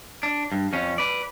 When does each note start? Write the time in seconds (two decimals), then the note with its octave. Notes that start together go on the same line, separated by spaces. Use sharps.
0.23 D4
0.52 G2
0.73 F2 C#4
0.98 B4 D5